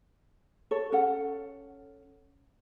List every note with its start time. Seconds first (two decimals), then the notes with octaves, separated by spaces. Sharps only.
0.71 A4 C#5
0.92 C#4 A4 F#5